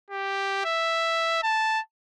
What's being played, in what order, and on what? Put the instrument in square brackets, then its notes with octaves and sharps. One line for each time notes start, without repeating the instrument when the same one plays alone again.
[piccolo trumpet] G4
E5
A5